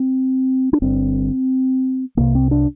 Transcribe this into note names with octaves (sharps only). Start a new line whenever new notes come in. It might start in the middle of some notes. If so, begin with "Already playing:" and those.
Already playing: C4
D4
G1 G2 D3 C4
C2 C3 A#3
C4
D4